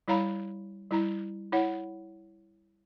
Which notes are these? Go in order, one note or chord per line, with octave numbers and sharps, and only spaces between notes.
G3 E4 C#5 F5 A#5 B5
G3 E4 A#5
E4 C#5 F#5